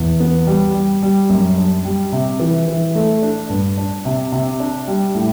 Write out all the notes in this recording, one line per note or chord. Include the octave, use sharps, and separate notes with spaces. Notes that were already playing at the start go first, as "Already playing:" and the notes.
Already playing: E2
B3
G3
G3
G3
F#2
D4
G3
C3
E3
E3
A3
D4
G2
D4
C3
C3
D4
G3
A2